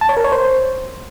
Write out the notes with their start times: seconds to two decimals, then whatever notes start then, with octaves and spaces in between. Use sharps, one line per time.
0.01 A5
0.09 C#5
0.17 A#4
0.24 C#5
0.32 C5